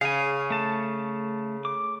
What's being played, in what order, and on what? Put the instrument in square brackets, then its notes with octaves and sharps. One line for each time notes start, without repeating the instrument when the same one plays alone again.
[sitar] C#3 [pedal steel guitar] F5 G#5
[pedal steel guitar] A3 A5
D6